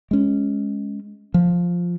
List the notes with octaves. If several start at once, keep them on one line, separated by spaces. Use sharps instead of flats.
G#3 C#4
F3